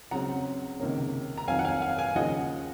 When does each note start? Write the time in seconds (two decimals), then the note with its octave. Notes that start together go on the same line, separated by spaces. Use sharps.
0.11 C#2 C#3 F#3 C4 F#5 A#5
0.80 C#2 C3 D#3 A#3 C#4
1.38 A#5
1.48 F2 D#3 F#3 F5 G#5
1.59 F#5
1.65 F5 G#5
1.82 F5 G#5
1.98 F5 G#5
2.15 D#2 C#3 F3 A#3 D#5 F#5